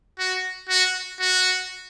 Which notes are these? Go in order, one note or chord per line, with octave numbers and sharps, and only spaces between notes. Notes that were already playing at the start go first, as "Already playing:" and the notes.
F#4
F#4
F#4